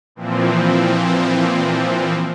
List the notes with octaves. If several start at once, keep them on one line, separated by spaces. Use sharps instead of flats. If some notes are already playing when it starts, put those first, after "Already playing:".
A#2 E3 F3 C4